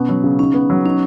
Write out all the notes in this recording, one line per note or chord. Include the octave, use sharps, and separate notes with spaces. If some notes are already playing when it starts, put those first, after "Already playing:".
Already playing: B2 B3 C#4
F#3
C#3
C#4 D#4
B3
F#3
C#4 D#4